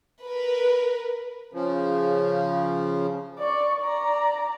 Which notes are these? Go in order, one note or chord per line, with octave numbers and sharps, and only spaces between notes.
A#4 B4
C#3 F3
D5 C#6
D5 A#5